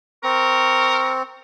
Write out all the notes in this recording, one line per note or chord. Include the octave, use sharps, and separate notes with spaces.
C4 A#4 C#6